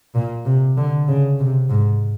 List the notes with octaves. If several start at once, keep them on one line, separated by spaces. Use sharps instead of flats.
A#2
C3
D3
C#3
C3
G#2